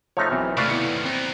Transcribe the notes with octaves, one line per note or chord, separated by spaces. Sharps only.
F3 A3 D#4 C#5 F6
B1 B2 E3 C4
D#2 C3 A3 B4 D5 F5 C#6
B3 E4 C#7
B3 C4 D#4